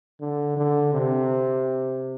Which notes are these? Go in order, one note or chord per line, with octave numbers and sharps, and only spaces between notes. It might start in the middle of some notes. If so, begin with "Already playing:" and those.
D3
D3
C3